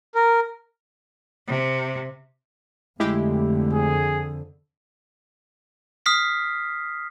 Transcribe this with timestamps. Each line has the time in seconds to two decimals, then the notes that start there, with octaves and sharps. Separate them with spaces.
0.15 A#4
1.47 C3
3.00 F2 D3 G#3 A3 E4 G4
3.73 G#4
6.06 D#6 F6 B6 C7